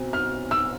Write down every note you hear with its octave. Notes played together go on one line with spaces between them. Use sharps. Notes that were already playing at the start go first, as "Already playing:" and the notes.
Already playing: B1 C4
F6
E6